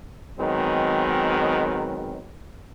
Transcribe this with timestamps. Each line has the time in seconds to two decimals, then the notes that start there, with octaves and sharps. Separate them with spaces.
0.40 D#3 F#3 G#3 B3 C4